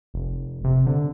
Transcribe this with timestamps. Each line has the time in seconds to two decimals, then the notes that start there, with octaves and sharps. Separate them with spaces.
0.14 F1
0.64 C3
0.87 D3